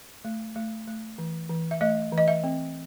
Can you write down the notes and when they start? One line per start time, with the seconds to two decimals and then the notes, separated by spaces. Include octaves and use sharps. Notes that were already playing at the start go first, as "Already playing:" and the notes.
0.25 A3
0.56 A3
0.88 A3
1.18 E3
1.50 E3
1.71 E5
1.81 A3 D#5
2.12 E3
2.18 D#5
2.28 E5
2.44 C4